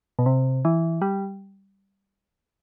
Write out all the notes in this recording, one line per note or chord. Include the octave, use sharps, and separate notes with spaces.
B2
C3
E3
G3